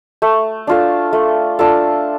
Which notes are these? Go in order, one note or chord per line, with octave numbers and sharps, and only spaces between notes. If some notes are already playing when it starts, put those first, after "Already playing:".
A3
D4 F4 A4
A3
D4 F4 A4